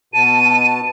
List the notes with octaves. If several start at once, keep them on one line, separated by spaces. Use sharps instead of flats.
B2 A5 D#7